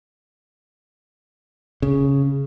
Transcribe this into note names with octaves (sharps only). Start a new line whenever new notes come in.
C#3